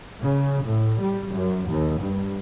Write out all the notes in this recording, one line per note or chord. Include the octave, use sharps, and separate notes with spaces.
C#3
A2
G3
F#2
D#2
G2